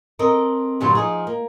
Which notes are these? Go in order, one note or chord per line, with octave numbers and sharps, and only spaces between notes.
C4 A4 A#4 D#5
G2 A#2 D3 F#3 A4 C5
F3 D#4 G#4
A#3